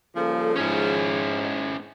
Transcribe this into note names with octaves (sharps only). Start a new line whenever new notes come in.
C#3 F3 G3 A#3 A4
G#2 C#4 E4